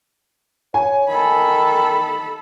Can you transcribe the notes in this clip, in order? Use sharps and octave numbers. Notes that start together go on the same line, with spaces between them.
C#5 G#5
D#3 A4 B5